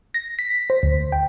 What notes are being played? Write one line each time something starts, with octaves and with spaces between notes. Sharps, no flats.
A#6
B6
C5
D2
G5